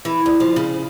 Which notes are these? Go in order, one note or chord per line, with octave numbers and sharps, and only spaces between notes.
E3
D2
F3
C#3